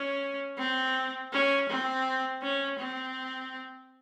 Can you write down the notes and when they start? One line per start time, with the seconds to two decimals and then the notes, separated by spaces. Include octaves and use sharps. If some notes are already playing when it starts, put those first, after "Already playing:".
Already playing: C#4
0.59 C4
1.32 C#4
1.69 C4
2.42 C#4
2.79 C4